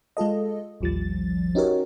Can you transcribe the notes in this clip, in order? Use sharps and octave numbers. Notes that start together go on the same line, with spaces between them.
G#3 F4 A4 D#5
A1 D#2 F3 G3 A6
C#4 D#4 F#4 G4 A#4 C#5